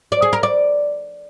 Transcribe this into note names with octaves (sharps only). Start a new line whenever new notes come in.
D5
G#4
A#4
D5